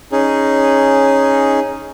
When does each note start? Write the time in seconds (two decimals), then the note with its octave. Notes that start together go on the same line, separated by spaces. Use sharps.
0.12 C#4 D#4 G#4